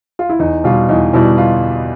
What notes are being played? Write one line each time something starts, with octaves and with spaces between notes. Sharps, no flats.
F4
E4
E2 D#4
B2 G3 F4
E2 D#4
B2 G3 E4
F4